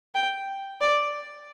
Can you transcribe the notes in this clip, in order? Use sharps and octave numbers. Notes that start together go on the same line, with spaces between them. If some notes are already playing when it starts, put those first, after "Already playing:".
G5
D5